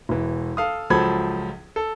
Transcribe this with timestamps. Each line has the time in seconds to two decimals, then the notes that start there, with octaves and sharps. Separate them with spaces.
0.09 E1 E3
0.57 A4 F5 D#6
0.90 C#2 F3 F#3 A4 B5 G#6
1.76 A4